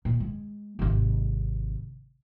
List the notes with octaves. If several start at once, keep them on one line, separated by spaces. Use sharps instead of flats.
A#2
G#3
G#1 C3